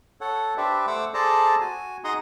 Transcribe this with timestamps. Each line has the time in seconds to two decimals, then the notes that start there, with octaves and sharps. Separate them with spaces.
0.21 A4 C#5 F#5
0.57 D4 G4 B4 C5 D5 E5
0.87 A3 C5 F#5 D6 E6
1.14 G#4 A4 C5 D5 A5 A#5
1.61 F#4 G#5
2.04 D#4 G#4 F#5 A#5 C6 D#6